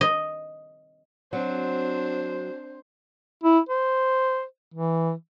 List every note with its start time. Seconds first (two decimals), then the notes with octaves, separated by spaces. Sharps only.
0.01 D#5
1.33 F#3 C4 D4 C5
3.44 E4
3.69 C5
4.74 E3